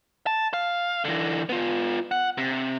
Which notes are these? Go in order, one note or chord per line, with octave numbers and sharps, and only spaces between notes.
A5
F5
D3 E3
B3 F4
F#5
C3